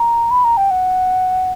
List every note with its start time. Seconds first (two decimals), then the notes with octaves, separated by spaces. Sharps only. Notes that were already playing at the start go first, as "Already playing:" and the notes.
Already playing: A#5
0.31 B5
0.44 A#5
0.57 G5
0.71 F#5